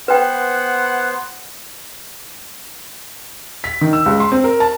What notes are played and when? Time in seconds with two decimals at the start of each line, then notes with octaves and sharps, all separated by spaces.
0.08 B3 B4 C5 F#5 G5
3.64 B6
3.81 D#3
3.93 E6
4.06 C#2
4.20 C6
4.32 C4
4.44 A#4
4.60 A5